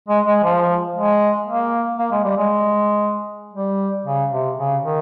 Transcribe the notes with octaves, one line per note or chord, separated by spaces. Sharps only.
G#3
G#3
F3
G#3
A#3
A#3
G#3
G3
G#3
G3
C#3
C3
C#3
D#3